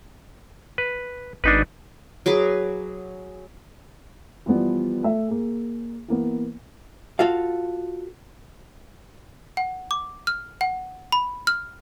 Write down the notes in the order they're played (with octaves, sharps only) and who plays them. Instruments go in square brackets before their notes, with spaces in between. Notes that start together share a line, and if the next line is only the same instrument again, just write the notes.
[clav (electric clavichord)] B4
[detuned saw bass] G#1 [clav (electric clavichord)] D4 D#4 B4
[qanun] F#3 G#4 B4 D6
[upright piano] E3 F3 G3 B3
A3 E5
A#3 G#4
E3 A#3 B3
[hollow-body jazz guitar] F4 F#4 A4 F5
[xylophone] F#5
D6
F6
F#5
B5
F6